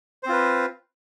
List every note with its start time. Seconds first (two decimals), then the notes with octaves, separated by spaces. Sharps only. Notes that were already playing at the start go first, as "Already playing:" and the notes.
0.23 C5
0.26 C4
0.29 F4
0.32 B4